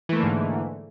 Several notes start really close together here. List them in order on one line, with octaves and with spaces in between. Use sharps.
E3 A3 A#3 D3 G#2